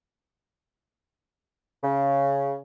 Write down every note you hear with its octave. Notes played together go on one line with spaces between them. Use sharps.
C#3